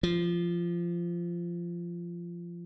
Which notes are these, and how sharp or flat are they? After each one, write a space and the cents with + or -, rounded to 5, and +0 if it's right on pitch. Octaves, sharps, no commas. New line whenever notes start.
F3 -15